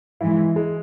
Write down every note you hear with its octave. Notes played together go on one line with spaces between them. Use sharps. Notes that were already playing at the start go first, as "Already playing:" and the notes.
G#2 E3 G#3 E4
G#3